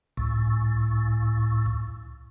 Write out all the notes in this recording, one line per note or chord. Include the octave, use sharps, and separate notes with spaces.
C#2 A2